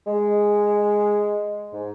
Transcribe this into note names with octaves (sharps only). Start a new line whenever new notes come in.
G#3
G#2